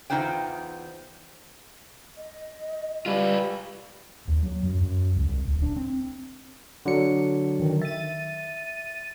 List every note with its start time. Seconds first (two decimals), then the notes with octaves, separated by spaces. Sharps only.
0.10 E2 G#3 D#4 F4 C5 G5
2.17 D#5
3.06 G3 F4 B4
4.28 D#2
4.42 F#3
4.63 F#2
4.81 F#2
5.16 C#2
5.28 C2
5.45 D1
5.62 D4
5.76 C4
6.86 D3 F#3 C#7
7.59 D#3
7.82 E5 A6 D#7